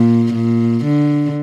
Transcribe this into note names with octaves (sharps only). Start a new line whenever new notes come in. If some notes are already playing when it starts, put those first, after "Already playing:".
Already playing: A#2
A#2
D3